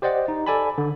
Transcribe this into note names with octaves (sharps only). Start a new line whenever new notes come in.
G4 C5 D5 D#5 F#5
D#4
A4 D5 G#5 A5 B5
D3